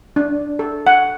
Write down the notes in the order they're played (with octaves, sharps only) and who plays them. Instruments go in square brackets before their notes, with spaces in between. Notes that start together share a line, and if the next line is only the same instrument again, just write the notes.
[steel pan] D4
A4
F#5